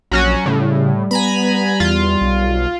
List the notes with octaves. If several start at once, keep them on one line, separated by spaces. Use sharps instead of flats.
A#1 F#3 C#4 F#4
A2 C#3 G3
B3 G#5 A#5 B5
E2 F4
B1